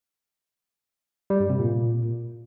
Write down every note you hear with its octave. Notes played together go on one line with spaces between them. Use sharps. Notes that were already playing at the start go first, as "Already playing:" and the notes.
G3
G2
C3
A#2